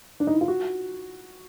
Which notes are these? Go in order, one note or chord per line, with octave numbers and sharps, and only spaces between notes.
D4
D#4
E4
F4
F#4